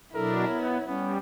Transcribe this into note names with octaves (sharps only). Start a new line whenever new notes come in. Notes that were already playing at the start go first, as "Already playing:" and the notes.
B2 F#3 D4 E4 A4 A#4
B3 C#5
G3 B3 C#4